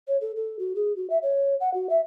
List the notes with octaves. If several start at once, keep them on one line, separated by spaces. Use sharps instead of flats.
C#5
A4
A4
F#4
G#4
F#4
E5
C#5
F#5
F#4
E5